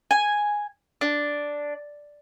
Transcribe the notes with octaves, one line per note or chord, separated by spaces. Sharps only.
G#5
D4